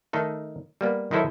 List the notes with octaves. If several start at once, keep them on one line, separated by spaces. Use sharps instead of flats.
D#3 A3 D#4 A4
G3 A#3 B3
D#3 F#3 D#4 E4 A4 C5